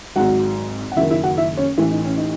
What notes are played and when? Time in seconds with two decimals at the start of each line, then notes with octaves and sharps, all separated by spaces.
0.16 G#1 G#2 F#3 F#4 F#5
0.92 F#5
0.96 F#1 F#2 D#3 E4 E5
1.10 E4 E5
1.24 F#4 F#5
1.37 E4 E5
1.57 C#4 C#5
1.78 A1 A2 E3 E4
1.91 D#4
2.05 C#4
2.17 D#4